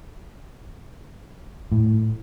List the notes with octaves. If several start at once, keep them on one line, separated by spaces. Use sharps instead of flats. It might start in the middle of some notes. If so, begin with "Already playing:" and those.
A2